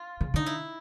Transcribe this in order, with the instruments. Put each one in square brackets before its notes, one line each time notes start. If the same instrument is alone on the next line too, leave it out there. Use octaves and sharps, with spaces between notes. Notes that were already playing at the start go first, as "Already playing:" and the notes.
Already playing: [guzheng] F4
[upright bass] C#3
[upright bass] D3 [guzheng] D#4
[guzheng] E4